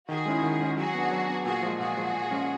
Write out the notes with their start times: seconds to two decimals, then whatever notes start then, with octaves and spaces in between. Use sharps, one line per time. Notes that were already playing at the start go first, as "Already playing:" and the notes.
0.09 D#3 F#4 G#4
0.26 G#3 C#4 E4
0.43 D#3
0.60 G#3 C#4 E4
0.77 F#3 F#4 G#4
0.94 B3 D4
1.11 F#3
1.28 B3 D4
1.45 A#2 F#4 G#4
1.62 F3 G#3
1.80 A#2 F#4 G#4
1.97 F3 G#3
2.14 A#2
2.31 F3 G#3 C#4